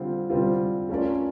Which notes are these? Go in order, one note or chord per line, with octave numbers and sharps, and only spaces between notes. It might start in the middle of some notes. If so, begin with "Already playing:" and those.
Already playing: D3 G3 C4 F4
D3 G3 C4 F4
A3 C#4 F4 A#4 D5